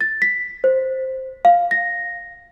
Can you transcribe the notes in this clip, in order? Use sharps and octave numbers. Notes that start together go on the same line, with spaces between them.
A6
B6
C5
F5
A#6